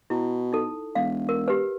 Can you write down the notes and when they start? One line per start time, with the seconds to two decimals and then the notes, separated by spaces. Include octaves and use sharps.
0.10 B2 E4
0.53 D#4 A4
0.95 E1 F5
1.29 A#4
1.48 G4 B4